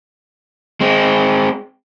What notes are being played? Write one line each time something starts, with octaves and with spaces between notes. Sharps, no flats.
G#3 C4